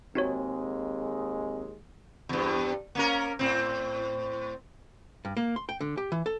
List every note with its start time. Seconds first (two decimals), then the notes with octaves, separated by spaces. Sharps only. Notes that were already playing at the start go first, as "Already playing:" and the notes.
0.15 D#2 G#3 C4 D#4 F#4 C#5
2.29 E2 G2
2.95 A#3 C#4 A#4
3.39 A2 C4
5.25 G2
5.37 A#3
5.56 C6
5.69 G5
5.81 D3
5.97 G4
6.12 E3
6.26 A4